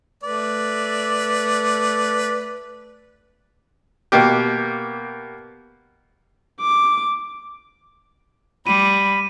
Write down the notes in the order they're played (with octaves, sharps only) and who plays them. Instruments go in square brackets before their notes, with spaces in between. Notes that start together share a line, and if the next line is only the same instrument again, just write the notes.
[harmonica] A3 B4 D5
[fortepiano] B2 A#3 G4
[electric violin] D6
[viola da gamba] G3 [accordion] B5 [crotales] D#7